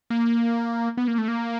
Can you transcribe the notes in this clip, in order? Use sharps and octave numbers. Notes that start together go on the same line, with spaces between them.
A#3
B3
A#3
A3
A#3